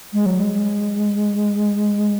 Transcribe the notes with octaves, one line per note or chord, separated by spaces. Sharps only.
G#3
F#3
G#3